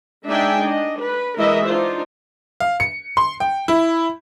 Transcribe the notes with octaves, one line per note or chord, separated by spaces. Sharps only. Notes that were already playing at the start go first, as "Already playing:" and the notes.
G#3 D4 D#4 E5 G5 G#5
D4 D#5
B4
E3 G#3 E4 A#4 D#5 E5
D4 D#4 F4 C5
F5
C#7
C6
G5
E4